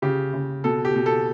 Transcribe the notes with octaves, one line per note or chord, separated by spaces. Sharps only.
C#3 G4
C#3
B2 A4
G4
B2
A4